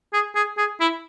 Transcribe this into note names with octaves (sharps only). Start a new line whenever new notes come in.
G#4
G#4
G#4
E4